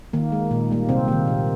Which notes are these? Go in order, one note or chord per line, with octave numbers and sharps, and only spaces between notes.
D#3 A#3
G#3
A#2
G3 A#3
C3 C4
D#3 A#3
A#2